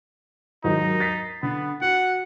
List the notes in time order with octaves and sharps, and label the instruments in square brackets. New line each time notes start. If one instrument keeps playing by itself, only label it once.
[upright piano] D#2 G#2 F#3 [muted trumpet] D#4
[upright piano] A6 B6 C7
[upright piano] D3 [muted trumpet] B3
[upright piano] F#4 [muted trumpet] F#5